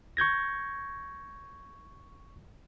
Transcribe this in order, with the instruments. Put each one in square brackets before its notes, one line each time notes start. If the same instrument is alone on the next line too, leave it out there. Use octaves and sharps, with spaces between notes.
[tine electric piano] C#6 G6 G#6 A#6